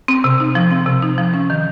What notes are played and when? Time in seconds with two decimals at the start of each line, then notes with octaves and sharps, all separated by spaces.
0.08 C4
0.24 C3
0.40 D#4
0.55 F3
0.71 C4
0.86 C3
1.02 D#4
1.18 F3
1.34 C#4
1.50 D#3